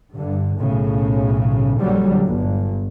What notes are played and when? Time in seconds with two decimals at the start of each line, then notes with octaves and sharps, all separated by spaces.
0.14 G2 D3
0.56 B1 A2 C#3
1.80 A#1 D3 F#3 G3
2.26 G1 G2